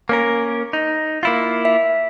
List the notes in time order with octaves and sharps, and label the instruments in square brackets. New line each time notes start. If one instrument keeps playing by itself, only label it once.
[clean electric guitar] A#3 C#4 A#4
D#4
A#3 E4 F4
[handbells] E5